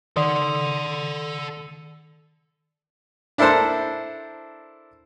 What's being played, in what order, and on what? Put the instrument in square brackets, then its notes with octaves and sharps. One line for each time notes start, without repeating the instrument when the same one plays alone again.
[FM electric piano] D#3 [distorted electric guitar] A4 F#5 [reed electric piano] D5 C6 D#6
[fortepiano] D4 E4 A4 A#4 C5 A5